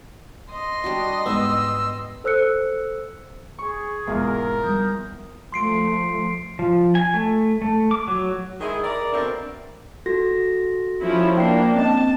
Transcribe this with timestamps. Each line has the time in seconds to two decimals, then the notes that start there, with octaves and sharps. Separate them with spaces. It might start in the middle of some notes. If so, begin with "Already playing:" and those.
0.50 D#5 C6
0.84 G3 D4 F#4
1.26 G#2 B3 E6
2.24 A4 C5 E6 F#6 C#7
3.59 G#4 C#6
4.07 E1 E2 G#2 F4 A#4
4.64 D#3 G3 D#6 G6
5.52 F3 A3 C6 C7 D7
6.59 F3
6.95 G#5
7.14 A3
7.62 A3
7.91 D6
8.08 F#3
8.61 D#3 G#3 E4 G#4
8.84 A#4 D5
9.12 B2 A3 C4 D4 A#4
10.06 F#4 A4 A#6
11.00 F3 C#4 E4
11.37 A#3 D4 G5 C7
11.75 C4 C#4 D#5 A5